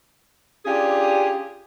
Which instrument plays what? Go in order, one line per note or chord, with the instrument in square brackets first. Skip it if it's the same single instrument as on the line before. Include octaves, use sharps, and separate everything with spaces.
[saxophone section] C#4 D4 F4 G4 G#4